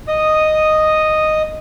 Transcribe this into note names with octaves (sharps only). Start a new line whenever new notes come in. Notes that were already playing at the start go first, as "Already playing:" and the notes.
D#5 D#6